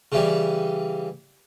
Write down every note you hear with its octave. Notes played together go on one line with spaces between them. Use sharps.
C#3 E3 G3